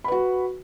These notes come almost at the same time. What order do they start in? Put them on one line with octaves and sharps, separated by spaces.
B5 B4 F#4